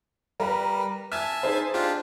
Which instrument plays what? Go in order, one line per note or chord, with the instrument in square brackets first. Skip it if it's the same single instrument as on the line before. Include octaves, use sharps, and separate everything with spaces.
[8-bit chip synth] G3 [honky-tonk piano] A#4 B4 A#5
[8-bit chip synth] E5 G#5 A5 [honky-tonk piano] F6 G#6
[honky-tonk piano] D#4 G#4 C5
[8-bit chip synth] D4 F4 G4